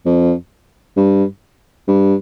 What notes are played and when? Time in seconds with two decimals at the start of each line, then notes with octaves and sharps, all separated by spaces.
0.06 F2
0.97 G2
1.88 G2